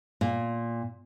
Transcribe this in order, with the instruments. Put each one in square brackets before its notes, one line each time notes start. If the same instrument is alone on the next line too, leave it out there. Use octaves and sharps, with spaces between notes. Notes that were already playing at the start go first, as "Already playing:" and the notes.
[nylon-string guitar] A#2